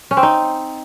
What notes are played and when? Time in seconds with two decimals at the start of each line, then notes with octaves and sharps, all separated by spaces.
0.11 C#4
0.17 C4
0.23 D#4